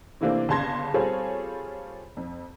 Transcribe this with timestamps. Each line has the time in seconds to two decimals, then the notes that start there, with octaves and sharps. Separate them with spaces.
0.21 C3 E3 A3 A#3 C4 D4
0.49 G1 C#3 A5 C6 G#6 A#6
0.94 G3 C4 F4 G#4 A4 C#5
2.17 F2